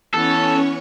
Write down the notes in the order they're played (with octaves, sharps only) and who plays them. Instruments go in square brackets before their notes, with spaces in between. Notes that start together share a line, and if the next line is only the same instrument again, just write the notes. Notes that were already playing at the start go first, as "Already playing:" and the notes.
[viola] E3 B3 [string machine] C#4 C#5 [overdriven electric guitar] A4